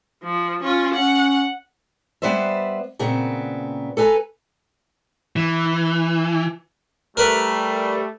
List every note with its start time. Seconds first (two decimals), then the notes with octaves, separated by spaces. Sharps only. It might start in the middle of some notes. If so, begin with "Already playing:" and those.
0.24 F3
0.64 C#4 F4
0.94 C#4 F#5
2.22 G3 B3 B4 C5 D5 E5
2.99 A#2 C#3 B3 C4
3.97 A4 B4 G#5 A#5
5.36 E3
7.17 G3 A3 A#4 B4